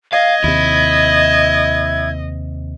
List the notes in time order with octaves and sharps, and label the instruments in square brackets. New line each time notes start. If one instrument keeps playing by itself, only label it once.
[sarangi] D#5 [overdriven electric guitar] F5 [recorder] G#6
[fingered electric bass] D#2 C3 [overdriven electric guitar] E4